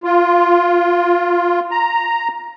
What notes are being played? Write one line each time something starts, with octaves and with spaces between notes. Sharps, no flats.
F4
A#5